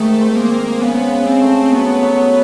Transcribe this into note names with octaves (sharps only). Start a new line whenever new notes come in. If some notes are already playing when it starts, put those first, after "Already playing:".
Already playing: G#2 D#3 A3
C4
A#3
C4
C#3 B3
C#3
C4
A3
F#3 B3
F#3